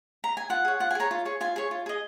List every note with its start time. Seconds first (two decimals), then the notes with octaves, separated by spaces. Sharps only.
0.24 A#5
0.37 G#5
0.50 F4 F#5
0.65 G#4 C#5
0.80 F4 F#5
0.91 G#5
0.95 G#4 C#5 A#5
1.11 F4
1.25 G#4 C#5
1.41 F4 G#5
1.56 G#4 C#5
1.71 F4
1.86 G#4 D#5